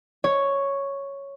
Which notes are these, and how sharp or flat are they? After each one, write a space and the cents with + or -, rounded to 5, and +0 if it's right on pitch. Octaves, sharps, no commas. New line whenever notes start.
C#5 +0